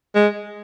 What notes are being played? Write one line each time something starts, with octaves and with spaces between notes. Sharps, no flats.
G#3